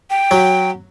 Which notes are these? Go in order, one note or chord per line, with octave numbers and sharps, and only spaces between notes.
G5
F#3